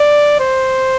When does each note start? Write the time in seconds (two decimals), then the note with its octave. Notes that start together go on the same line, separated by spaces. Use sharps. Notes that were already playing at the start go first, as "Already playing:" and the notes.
Already playing: D5
0.40 C5